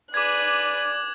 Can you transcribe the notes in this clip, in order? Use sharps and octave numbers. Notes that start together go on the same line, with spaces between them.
G#4 B4 D5 D6 F#6 G#6